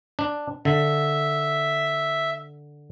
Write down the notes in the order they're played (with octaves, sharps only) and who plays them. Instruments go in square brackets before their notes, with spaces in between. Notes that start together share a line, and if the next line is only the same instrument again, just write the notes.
[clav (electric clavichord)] D4
[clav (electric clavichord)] D3 [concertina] E5